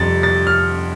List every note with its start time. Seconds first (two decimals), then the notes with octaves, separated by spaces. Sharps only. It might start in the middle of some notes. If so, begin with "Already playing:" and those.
Already playing: F2 C3 G3 A6
0.23 A6
0.47 F6